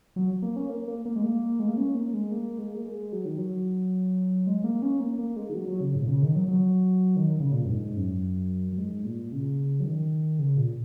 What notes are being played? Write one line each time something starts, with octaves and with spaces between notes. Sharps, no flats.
F#3
A#3
C#4
A#3
A#3
A#3
G#3
A#3
G#3
A#3
C#4
A#3
G#3
A#3
G#3
A#3
G#3
F#3
D#3
F#3
G#3
A#3
C#4
A#3
A#3
G#3
D#3
F#3
F#3
C#3
G#2
A#2
C#3
D#3
F#3
F#3
D#3
C#3
A#2
F#2
G#2
F#2
F#2
G#2
A#2
C#3
F#3
D#3
C#3
A#2